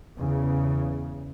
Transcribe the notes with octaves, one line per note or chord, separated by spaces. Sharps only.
E2 C#3